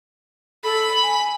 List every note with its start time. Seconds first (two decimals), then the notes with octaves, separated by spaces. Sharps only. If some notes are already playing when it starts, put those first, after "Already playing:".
0.64 A4 B5
1.03 G#5